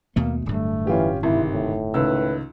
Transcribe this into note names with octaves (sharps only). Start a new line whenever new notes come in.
D#2 B2 A3 A#3
D1 G2 A3
E3 C#4 F4 G4
G#1 G#2 C3 E4
A2
C#2 D#3 B4 E6